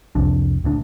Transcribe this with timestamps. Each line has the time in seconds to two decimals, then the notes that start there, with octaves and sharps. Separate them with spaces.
0.15 C2 F2 C3 D4
0.64 D#1 D2 D4